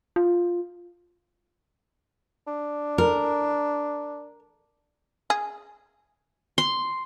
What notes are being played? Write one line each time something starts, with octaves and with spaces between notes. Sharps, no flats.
F4
D4
A#4
G#4
C6